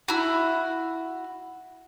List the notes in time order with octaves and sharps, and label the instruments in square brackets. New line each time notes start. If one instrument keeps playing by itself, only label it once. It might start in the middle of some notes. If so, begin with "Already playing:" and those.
[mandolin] E4 F#4